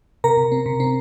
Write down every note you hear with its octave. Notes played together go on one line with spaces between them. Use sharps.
C3 A#4 A#5
C3
C4
C3
C4